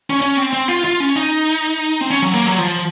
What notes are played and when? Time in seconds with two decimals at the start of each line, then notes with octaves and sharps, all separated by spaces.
0.10 C#4
0.22 C#4
0.37 C4
0.53 C4
0.68 F4
0.85 F4
1.00 C#4
1.16 D#4
2.01 C4
2.10 C#4
2.22 F#3
2.34 A#3
2.46 F#3
2.58 F3